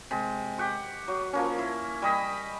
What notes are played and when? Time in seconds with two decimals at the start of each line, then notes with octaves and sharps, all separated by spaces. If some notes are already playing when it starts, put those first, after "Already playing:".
0.11 C3 G#3
0.58 G4 F#5 C#6
1.08 F#3
1.33 F3 A#3 C#4
1.58 E4
2.02 G3 D#5 B5